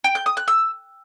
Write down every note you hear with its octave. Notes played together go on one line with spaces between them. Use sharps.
G5
G6
D#6
F#6
E6